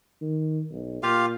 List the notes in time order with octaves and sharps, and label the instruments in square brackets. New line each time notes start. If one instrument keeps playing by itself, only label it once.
[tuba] D#3
B1
[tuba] A#2 [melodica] F4 G4 F5